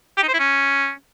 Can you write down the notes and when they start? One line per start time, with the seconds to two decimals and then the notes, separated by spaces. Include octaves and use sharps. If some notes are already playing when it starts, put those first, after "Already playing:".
0.17 G4
0.23 D#4
0.28 C5
0.34 E4
0.39 C#4